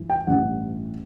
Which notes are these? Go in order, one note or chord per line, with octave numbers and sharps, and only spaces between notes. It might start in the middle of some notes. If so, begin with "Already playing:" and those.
Already playing: G2 E3
G5
A1 G2 E3 F#5